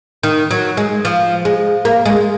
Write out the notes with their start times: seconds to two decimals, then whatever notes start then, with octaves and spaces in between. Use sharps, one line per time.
0.23 D#3
0.51 F#3
0.77 G#3
1.05 F3
1.45 G#3
1.85 A#3
2.06 G#3